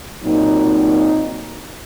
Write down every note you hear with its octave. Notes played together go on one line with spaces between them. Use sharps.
A#2 F#3 C4 D#4